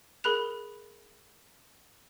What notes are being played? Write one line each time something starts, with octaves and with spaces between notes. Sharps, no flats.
G#4 A#4 B5 F#6 F7